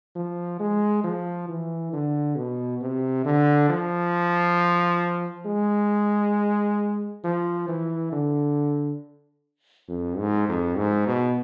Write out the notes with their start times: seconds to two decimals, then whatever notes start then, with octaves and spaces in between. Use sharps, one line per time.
0.16 F3
0.59 G#3
1.04 F3
1.48 E3
1.93 D3
2.36 B2
2.81 C3
3.25 D3
3.69 F3
5.46 G#3
7.24 F3
7.68 E3
8.12 D3
9.89 F2
10.18 G#2
10.49 F2
10.77 G#2
11.07 B2